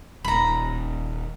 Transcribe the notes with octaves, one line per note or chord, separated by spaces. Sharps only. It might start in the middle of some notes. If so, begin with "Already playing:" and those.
D#1 A#5 B5